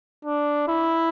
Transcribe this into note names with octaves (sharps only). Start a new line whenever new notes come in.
D4
E4